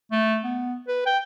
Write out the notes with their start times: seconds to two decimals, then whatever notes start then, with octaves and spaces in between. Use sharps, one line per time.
0.12 A3
0.44 B3
0.88 B4
1.06 G5